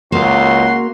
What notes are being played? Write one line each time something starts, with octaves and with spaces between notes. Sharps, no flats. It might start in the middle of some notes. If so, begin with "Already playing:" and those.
C#2 A#3 F#4 C6